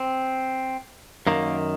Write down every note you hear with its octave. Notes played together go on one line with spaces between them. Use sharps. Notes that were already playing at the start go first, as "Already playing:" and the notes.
Already playing: C4
F#2 D#3 A#3